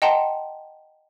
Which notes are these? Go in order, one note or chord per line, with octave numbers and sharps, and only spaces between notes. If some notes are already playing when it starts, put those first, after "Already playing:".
D#5 F#5 G5 A5 A#5 C6